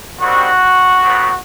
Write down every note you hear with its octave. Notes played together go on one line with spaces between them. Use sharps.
D#3 G3 C4 F#4
A2 F#3 B3